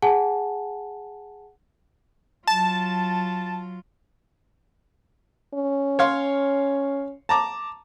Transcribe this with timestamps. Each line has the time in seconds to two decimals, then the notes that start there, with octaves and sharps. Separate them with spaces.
0.02 G#4 F#5 G#5 A5
2.48 F#3 F4 A5
5.54 C#4
5.99 C#5 F5 C6
7.29 A5 A#5 D6